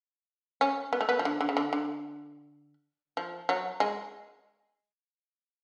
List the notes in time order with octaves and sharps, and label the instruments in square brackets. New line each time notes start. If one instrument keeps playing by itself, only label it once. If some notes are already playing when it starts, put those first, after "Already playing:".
[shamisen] C#4
B3
A3
B3
F3
D3
D3
C#3
D3
D3
F3
F#3
G#3